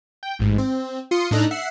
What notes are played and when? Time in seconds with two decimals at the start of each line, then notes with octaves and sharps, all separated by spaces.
0.23 G5
0.39 A1 G#2
0.58 C4
1.11 F4 C6 D#6 C#7
1.31 A2 D4 D#4 A4 A#5 F#6
1.51 E5 F#5 C7